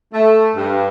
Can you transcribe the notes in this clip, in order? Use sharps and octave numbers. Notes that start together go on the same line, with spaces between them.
A3
G2